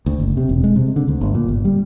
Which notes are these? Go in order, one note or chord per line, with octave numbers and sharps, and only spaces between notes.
D2
F#1
C3
E1
G#3
C3
D3
D2
G1
A#2
G1
G3